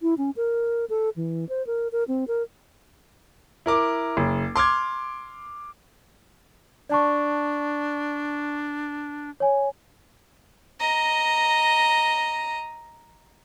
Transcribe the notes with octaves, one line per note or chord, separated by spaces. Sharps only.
E4
C#4
A#4
A4
E3
C5
A#4
A#4
C4
A#4
E4 A#4 D6
F#1
C6 D6 F6 G#6
D4 D5 A5 C#6
C#5 G#5
D#5 A#5